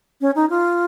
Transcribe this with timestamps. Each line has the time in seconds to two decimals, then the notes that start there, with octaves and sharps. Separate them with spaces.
0.21 C#4
0.36 D#4
0.50 F4